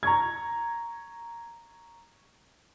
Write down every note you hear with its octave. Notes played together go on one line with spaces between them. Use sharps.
A#5 C#6 G#6